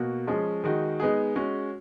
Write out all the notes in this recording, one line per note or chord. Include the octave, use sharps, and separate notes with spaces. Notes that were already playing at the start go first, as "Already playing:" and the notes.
Already playing: B2 A#3 F#4
F3 G#3 C#4 G#4
D#3 G#3 D#4 F#4
G#3 B3 D#4 G#4
G#3 C#4 F#4